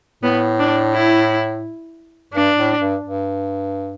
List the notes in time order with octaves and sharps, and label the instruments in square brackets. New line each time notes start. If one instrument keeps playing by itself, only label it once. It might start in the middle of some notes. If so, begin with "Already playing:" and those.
[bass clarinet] A2 [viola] B3
[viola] D4
E4
[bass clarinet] G2 [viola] D4
[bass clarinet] A2
G2
G2